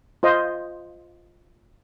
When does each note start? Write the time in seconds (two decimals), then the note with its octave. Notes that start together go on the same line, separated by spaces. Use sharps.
0.23 F4 C5 D#5